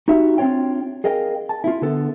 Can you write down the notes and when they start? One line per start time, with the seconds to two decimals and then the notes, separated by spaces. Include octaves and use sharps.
0.08 D#4 F#4 G4 E5
0.38 C4 D4 F4 C#5 G5
1.04 G#4 A#4 D#5 F5 G5
1.49 A5
1.64 E4 F4
1.82 D3 B3 A4